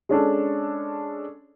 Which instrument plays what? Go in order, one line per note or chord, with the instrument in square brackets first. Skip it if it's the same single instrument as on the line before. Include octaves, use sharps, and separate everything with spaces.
[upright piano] G#3 C#4 D4 A4